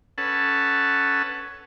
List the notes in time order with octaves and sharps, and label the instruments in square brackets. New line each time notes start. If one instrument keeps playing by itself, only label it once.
[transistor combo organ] C#4 A4 B4 F#5 A5